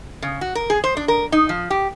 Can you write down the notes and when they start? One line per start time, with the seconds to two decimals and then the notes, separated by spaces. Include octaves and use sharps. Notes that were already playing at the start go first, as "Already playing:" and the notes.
0.22 C#3
0.41 F#4
0.55 A#4
0.70 G#4
0.84 C5
0.97 D4
1.08 A#4
1.32 D#4
1.49 F3
1.70 G4